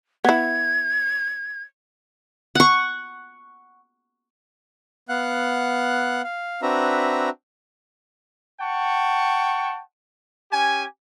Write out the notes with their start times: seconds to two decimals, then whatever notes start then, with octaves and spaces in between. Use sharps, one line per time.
0.25 B3 E4 G#6
2.55 F#5 C#6
5.09 B3 F5 F#5 F#6
6.24 F5
6.62 C4 D4 F#4 B4 E5 A#5
8.60 F#5 G5 A5 C#6
10.52 C#4 G4 G#5